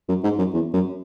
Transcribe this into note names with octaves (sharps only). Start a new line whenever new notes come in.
F#2
G#2
F#2
E2
F#2